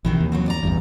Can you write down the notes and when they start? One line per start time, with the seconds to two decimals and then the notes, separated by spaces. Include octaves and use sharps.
0.05 A#1 C3 D#3 E3
0.20 D#2
0.32 F#3 B3 C4
0.48 D5 A#5
0.63 A1 E2 G2